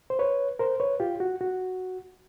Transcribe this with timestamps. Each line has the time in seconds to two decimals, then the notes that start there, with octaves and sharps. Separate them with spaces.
0.10 C5
0.19 B4 C#5
0.59 A#4 C5
0.80 B4 C#5
1.00 F4 G4
1.20 F#4
1.41 F#4